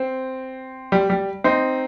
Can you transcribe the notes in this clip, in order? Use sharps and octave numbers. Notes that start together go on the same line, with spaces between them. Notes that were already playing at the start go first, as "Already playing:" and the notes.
Already playing: C4
G3
G3
C4 D#4